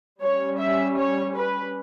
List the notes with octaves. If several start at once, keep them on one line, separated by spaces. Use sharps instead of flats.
G3 C#4 C#5
E5
C#5
B4